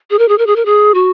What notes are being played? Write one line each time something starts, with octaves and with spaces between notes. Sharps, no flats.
G#4
A#4
G#4
A#4
G#4
A#4
G#4
F#4